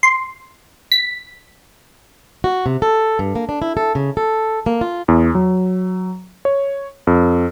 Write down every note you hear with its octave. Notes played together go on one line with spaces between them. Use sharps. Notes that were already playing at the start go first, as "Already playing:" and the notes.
C6
B6
F#4
C3
A4
G2
A#3
D4
E4
A4
C#3
A4
A#3
F4
E2
F#3
C#5
F2